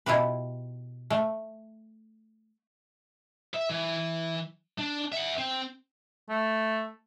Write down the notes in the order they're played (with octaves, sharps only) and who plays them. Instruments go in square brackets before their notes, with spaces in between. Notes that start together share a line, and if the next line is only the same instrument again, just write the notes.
[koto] B2 E4 F4 G4 B4
A3
[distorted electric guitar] E5
E3
D4
E5 F#5
C4
[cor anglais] A3